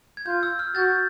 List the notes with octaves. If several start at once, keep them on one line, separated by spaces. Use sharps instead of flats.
G#6
F4 G6
E6
F6
F#4 G6 A6